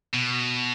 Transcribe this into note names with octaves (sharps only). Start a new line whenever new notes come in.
B2